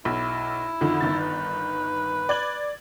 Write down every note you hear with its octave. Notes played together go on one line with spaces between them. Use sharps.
B1 E4
F2 D3 D#3
G1 D#3 A6
B4
D5 G#6 F#7